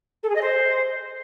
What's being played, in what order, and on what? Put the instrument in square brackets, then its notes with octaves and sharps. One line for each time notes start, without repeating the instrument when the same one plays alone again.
[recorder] A4
G#4
D#5
C5